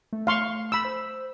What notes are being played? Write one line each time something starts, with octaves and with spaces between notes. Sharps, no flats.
A3
F5 C6 C#6
B5 E6
C5